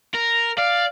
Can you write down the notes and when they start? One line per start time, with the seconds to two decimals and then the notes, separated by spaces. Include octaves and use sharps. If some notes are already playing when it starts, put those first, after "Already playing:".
0.14 A#4
0.58 D5 F5